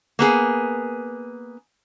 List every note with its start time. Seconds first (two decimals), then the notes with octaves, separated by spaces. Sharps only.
0.19 A#3 B3 G#4